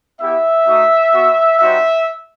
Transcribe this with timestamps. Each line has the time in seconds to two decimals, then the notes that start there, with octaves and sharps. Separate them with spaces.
0.20 B3 E4 G4 E5
0.67 A3 D#4 F#4
1.13 B3 F#4
1.59 G3 C4 D#4 F#4 E5